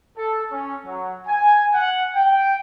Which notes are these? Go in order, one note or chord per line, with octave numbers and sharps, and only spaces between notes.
A4
C#4
F#3
G#5
F#5
G5